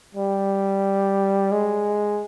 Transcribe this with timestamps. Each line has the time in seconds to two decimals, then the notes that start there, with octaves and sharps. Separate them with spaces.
0.15 G3
1.52 G#3